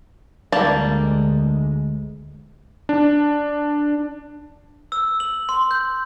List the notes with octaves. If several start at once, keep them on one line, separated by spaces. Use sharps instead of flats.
D2 G3 G#3 A#3 A5
D4
E6
F#7
C6
G6